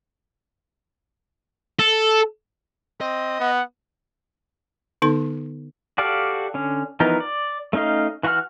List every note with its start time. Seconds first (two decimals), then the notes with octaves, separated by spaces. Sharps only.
1.79 A4
3.01 C4 D#5
3.40 B3 F#5
5.02 D3 B3 D#4 A4 C6
5.98 F#4 G4 A4 D5 F5
6.54 D3 C#4
7.00 E3 F3 B3 D#4 A#4
7.20 D5
7.73 A3 C#4 D#4 D#5 F5
8.23 E3 F#4 F#5 B5 F6